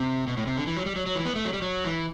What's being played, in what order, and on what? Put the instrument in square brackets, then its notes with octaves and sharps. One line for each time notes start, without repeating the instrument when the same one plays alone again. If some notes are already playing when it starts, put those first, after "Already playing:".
Already playing: [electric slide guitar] C3
B2
A2
C3
D3
E3
F#3
G3
F#3
F#3
E3
B3
A3
F#3
G3
F#3
E3